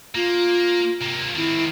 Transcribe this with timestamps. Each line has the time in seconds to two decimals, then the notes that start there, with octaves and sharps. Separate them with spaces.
0.15 A#3 F4
1.02 C3 A#3
1.36 D#3 C4 E4